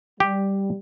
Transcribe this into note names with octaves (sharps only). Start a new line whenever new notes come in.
G3 G4